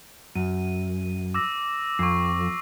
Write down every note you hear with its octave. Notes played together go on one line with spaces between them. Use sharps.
F#2 D#7
D6 E6 A#6
F2 C#6 D6 C7